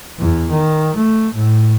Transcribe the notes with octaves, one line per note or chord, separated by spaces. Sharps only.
E2
D#3
A3
A2